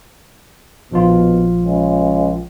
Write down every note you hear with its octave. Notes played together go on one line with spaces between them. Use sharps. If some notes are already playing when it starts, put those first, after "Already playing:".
A#1 B2 F3 F4
C#2